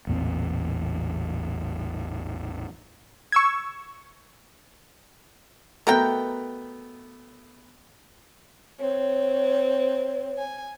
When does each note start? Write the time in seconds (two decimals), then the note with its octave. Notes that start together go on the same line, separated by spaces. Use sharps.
0.07 A1 E2 A#2 C4
3.32 C#6 E6 G#6
5.87 B2 A3 B3 A#4 G5
8.80 C4 C#5
10.38 G#5